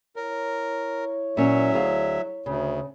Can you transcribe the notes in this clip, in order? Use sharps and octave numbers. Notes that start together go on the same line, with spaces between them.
E4 A#4 C#5
A#2 F#3 C#4 E5
D2 G#4 F5
D2 C#3